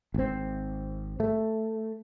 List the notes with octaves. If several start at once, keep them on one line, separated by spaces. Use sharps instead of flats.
G#1 C4
A3